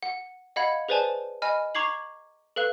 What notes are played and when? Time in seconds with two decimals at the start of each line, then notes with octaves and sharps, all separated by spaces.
0.03 F#5
0.56 D#5 F5 F#5 B5 G#6
0.89 G#4 B4 C5 D5 G#5 A5
1.42 D#5 G#5 B5 F6
1.75 A#5 C#6 D6 G#6 C7 F#7
2.56 A4 B4 F5 F#6